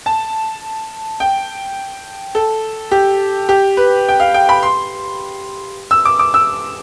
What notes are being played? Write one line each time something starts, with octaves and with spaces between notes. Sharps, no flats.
A5
G5
A4
G4
G4
B4
G5
F5
G5
B5
C6
E6
D6
D6
E6